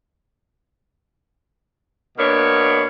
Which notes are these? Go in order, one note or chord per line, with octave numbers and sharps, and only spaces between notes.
B2 A#3 B3 D4 C#5